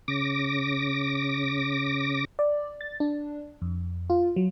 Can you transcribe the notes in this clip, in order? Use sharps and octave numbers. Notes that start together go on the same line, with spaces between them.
C#3 D6 A#6
D5
A6
D4
F2
F4
F#3